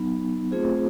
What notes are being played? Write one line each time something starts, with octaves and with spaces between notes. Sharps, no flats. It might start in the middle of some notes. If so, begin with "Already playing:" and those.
Already playing: F#3 B3 D#4
A3 C4 F4 G#4 C5